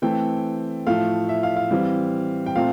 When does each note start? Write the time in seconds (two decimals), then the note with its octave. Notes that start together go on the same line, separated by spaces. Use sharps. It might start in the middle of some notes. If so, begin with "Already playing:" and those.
0.02 E3 A3 C4 G5
0.87 A2 F3 A3 F5
1.29 E5
1.43 F5
1.57 F5
1.71 E3 G3 C4
2.46 G5
2.56 A#2 A3 C4 F5